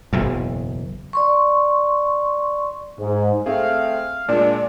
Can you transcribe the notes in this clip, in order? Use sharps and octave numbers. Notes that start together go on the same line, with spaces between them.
F#1 B1 E2
D5 C6 C#6
G#2
A3 C4 G#4 F5
A#2 G#3 D4 D5